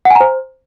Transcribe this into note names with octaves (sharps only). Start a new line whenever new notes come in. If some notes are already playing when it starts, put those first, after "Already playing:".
F#5
G#5
A#5
C5